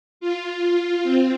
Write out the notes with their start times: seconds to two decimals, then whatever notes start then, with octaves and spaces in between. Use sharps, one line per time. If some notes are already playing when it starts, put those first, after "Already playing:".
0.21 F4
1.04 C4